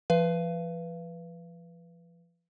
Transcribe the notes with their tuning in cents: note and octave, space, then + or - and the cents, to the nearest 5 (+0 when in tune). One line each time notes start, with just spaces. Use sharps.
F3 -30 B4 +0 F5 -35